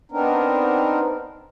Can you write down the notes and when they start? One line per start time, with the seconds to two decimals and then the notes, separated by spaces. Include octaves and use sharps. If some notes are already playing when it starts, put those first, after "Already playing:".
0.11 B3 C4 D4 D#4 A#4